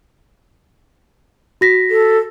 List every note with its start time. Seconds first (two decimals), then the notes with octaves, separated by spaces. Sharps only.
1.61 F#4 A#6 B6
1.90 A4